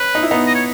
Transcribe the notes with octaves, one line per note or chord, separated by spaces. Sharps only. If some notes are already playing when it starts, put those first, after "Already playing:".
Already playing: C#4 B4
D#4
E4
B3 D#4
D#5
C#5